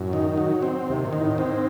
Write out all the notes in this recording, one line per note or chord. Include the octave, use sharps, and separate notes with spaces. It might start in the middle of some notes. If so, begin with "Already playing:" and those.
Already playing: F#2 A2
D#3
F#3
C4
D#2 C3
G#2
D#3
A2
G#2 C4